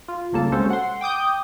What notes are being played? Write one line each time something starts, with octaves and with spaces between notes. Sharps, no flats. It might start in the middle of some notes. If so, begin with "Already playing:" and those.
F4
G1 C2 C#3 A#3 A4 A5
C3 G#3 C#4 F#4 A4 C5
F#5 C6
G5 D6 D#6 G6